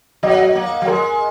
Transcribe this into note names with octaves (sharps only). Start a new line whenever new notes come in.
F#3 D#5
F#5
D#5
A#3
F#3
G#3 A#4